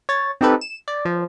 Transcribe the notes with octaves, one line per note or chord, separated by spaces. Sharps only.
C#5 A6
C4 D#4 G4 A4 B4
E7
D5
F3